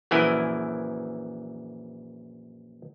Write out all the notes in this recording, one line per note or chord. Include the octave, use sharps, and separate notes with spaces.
A#1 F#2 E3 E4 G#5